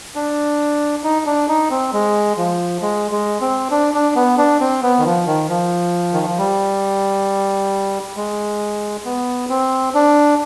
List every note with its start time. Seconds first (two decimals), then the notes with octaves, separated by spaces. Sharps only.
0.15 D4
1.04 D#4
1.26 D4
1.49 D#4
1.70 C4
1.93 G#3
2.37 F3
2.82 G#3
3.11 G#3
3.41 C4
3.71 D4
3.94 D4
4.16 B3
4.37 D4
4.60 C4
4.82 B3
4.99 D#3
5.05 F3
5.27 D#3
5.49 F3
6.13 D#3
6.26 F3
6.38 G3
8.17 G#3
9.05 B3
9.49 C4
9.94 D4